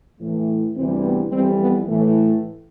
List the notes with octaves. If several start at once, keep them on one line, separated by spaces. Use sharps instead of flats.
A2 E3 A3
D2 C3 E3 G3 C4
B3
F2 E3 G3 C4
B3
A2 E3 A3